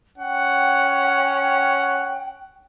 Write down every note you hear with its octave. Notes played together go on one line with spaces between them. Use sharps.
C#4 F#5 G5